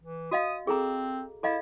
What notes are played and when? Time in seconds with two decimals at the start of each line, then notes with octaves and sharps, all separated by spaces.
0.01 E3
0.31 F#4 D#5 F5 D#6
0.67 C4 G#4 A4 A#5
1.43 E4 A4 D#5 F5